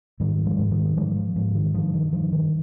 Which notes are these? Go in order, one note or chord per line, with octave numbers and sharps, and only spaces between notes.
G#2 D#3 G3
F3 G#3
G#2 G#3
D#3 G3
G#2 F3 G#3
F3
G#2 F3
D#3
G2 F3
D#3
G2 F3
D#3